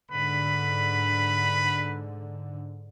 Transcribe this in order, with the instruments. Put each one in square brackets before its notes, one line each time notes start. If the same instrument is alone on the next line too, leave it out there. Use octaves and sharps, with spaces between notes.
[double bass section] G#2 D3 [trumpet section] B4 B5